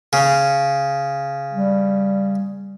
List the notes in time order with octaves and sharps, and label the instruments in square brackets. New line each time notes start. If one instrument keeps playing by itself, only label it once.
[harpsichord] C#3
[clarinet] G3